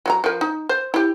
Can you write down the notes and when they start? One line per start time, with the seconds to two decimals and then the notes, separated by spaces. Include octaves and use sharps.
0.06 F#3 F#4 A#5
0.24 F3 A#4
0.41 D#4
0.69 C5
0.94 E4 G4